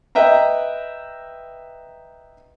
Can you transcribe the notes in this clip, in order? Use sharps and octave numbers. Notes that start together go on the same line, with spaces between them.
B4 D#5 E5 G5 A#5